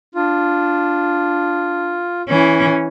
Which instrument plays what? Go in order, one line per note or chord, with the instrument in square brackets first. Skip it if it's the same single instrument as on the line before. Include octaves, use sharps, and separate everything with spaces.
[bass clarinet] D4 [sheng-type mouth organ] F4
[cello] E3 C#4